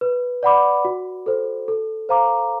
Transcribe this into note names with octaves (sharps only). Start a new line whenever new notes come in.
B4
D5 F#5 B5 D6
F#4
A4 C5
A4
C5 F5 A#5 D6